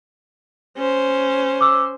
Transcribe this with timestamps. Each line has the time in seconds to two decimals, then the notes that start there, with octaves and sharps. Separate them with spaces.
0.77 C#4 C5
1.61 D6 E6